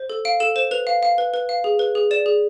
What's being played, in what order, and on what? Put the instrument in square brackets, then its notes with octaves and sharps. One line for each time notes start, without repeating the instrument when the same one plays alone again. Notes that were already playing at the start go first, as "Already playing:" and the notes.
Already playing: [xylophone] C5
A4
F5 D7
A4 E7
C5 E7
B4 F7
F5
F5
B4
B4
F5
G#4
B4
G#4
D5 E7
G#4